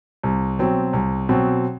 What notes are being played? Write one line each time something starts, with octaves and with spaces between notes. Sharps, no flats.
C2
B2 F#3 C4
C2
B2 F#3 C4